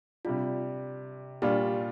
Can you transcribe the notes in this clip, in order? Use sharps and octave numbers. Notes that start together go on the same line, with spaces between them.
C3 G3 D4 F4
A#2 G3 D4 F4 G4